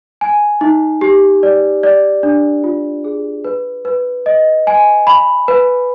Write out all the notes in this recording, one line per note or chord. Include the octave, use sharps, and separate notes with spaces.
G#5
D#4
G4
D5
D5
D4
F4
G#4
B4
B4
D#5
G#5
B5
B4